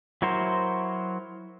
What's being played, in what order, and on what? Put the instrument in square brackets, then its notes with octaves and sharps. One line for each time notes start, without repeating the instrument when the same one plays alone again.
[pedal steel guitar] F#3 E4 F#4 A#4 C5